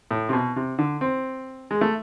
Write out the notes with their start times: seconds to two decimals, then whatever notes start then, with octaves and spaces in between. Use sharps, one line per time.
0.11 A2
0.29 C3
0.33 B2
0.56 C3
0.79 D3
1.01 C4
1.71 G#3
1.81 A3